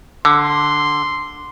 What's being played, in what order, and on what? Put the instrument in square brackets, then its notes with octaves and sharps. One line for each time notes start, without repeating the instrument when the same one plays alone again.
[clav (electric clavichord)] D3 [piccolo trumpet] C6